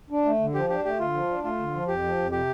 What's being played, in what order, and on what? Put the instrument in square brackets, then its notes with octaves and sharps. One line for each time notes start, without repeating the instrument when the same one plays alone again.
[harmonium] D4
A3
D3
[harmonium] F3 [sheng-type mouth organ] G4
[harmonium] D4 [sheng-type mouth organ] G4
[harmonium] A3 [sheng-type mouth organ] G4
[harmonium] D3 [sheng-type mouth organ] F4
[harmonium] F3
D4
[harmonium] A3 [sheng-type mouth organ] F4
[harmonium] D3
F3
[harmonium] F2 [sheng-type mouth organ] G4
[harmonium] F3
F2
[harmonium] C3 [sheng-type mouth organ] G4